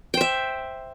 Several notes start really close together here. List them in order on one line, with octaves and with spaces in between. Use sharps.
G5 C5 E5